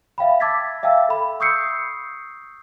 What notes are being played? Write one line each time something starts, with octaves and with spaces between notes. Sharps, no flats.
E5 F5 G5 B5
A5 D6 E6 G#6 A6 B6
E5 F5 G5 A5 E6
A4 B5
C#6 D#6 E6 G6 C7 C#7